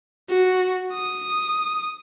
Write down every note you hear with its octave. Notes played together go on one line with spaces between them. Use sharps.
F#4
D#6